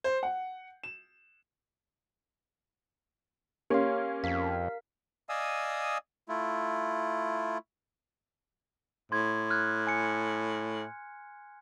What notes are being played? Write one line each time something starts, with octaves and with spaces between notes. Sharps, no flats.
C5
F#5
E7
A#3 C#4 G4 A#4 C#5 F5 C6
F2 A#4 F5 B6
D5 D#5 F5 G#5 D#6 E6
A3 E4 F4
A2 C6 G#6
F6 F#6 G#6
G#5 C#7